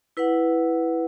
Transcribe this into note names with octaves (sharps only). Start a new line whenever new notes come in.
E4 B4 F#5